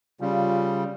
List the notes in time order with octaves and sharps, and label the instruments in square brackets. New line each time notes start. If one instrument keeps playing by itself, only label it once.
[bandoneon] C#3 G3 [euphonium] F4